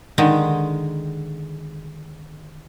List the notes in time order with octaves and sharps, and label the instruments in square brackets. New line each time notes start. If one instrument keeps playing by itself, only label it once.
[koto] D3 D#3 G#3